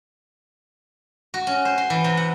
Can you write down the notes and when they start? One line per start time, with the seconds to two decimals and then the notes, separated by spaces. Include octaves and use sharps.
1.34 F#4
1.47 C#4
1.65 C5
1.78 C6
1.90 E3
2.04 C3
2.17 F#5